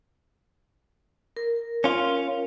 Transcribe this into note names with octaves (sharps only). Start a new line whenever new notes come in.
A#4
C#4 F4